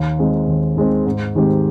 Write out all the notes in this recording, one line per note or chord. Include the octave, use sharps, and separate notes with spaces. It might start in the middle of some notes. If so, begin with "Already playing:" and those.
Already playing: D#2
D#3 G#3 C4
D#2
D#3 G#3 C4
G#2
D#3 G#3 C4 G4